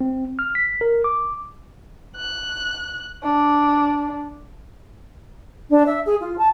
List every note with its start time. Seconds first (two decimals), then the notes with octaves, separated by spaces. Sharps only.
0.01 C4
0.39 F6
0.55 B6
0.81 A#4
1.04 D6
2.16 F#6
3.24 D4
5.70 D4
5.86 E5
6.06 G#4
6.20 F4
6.38 A5